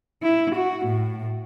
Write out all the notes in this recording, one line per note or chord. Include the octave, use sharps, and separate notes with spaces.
E4
F#4
A2